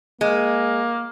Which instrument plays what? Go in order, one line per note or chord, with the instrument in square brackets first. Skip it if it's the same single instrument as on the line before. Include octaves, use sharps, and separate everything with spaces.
[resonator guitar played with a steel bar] G#3 [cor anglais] A#3